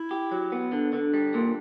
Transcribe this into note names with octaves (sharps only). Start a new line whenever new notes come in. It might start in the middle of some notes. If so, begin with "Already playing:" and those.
Already playing: E4
G4
F#3
B3
D3 D4
D3
G3
A#2